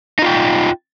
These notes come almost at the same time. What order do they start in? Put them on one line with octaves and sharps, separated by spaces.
D#4 F4 G5